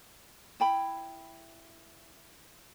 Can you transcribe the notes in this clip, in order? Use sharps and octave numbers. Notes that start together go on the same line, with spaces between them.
E4 G5 B5